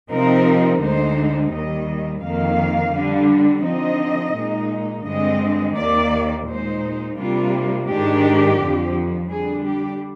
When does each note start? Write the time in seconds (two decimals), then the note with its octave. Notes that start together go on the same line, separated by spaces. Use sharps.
0.10 C3 F3 C4 D#4 A#4
0.81 D2 D3 G#3 D#4 C5
1.52 D#2 D#3 G3 D#5
2.22 F2 D#3 A#3 F5
2.93 D3 G3 D4
3.63 D3 F3 C4 D#4 D#5
4.34 A#2 G#3 D#4
5.05 G2 D3 G#3 C4 D#5
5.76 D#2 D#3 A#3 D5
6.47 A#2 G#3 D#4 C5
7.18 C3 G3 A#3 D4 F4
7.88 G#2 D#3 G#3 D4 G4
8.59 F2 D3 F3
9.30 D3 G3 D4 G#4
9.65 G4